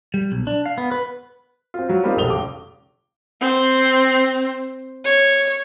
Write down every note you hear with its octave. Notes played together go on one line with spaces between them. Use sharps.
G3
B1
D4
F5
B3
B4
C4 F4
F#3 F4 F#4
G3 A#3 C4 D#4 F4 G4
F1 B1 A3 D#6 F7 G7
C#2 D6
C4
C#5